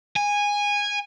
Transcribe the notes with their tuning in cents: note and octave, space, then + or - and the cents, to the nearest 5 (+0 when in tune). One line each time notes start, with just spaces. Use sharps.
G#5 -15